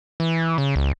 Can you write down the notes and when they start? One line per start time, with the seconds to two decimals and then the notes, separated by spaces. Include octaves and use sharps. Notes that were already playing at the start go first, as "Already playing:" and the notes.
0.20 E3
0.58 C#3
0.76 C#2